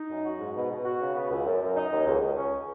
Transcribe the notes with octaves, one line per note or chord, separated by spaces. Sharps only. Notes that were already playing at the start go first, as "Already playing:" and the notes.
Already playing: D#4
F#2
F#4
G#2
B2
B2
F#4
C#3
B3
C#2
F#2
F#2
D#4
D#2
C#2
C#2
C#4